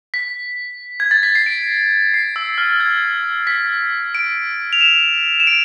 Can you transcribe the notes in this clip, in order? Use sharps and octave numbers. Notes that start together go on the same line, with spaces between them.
B6
G#6
A6
B6
C7
D7
C7
E6
F6
G#6
B6
D7
F7
E7
E7
D7